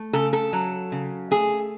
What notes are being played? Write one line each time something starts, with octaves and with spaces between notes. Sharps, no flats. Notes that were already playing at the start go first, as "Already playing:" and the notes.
Already playing: A3
C#3 A4
A4
F#3
C#3
A3 G#4